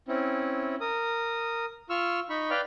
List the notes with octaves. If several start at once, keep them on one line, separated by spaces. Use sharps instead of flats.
C4 C#4 E4
A#4 D#6
F4 C#6 E6 F6
D#4 B5 C#6
B4 D5 F5 G5 F6